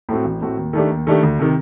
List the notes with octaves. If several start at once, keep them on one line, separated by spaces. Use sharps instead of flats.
A2 A3 C4 F#4
A1
A2 A3 C4 F#4
D#2
D#3 A3 D4 G4
D#2
D#3 A3 D4 G4
D2
C3 D#3